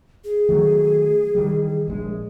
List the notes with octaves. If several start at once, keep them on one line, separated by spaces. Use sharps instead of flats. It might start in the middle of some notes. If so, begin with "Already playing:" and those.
G#4
D#3 F#3 A3
D#3 E3 G3
A#1 G#3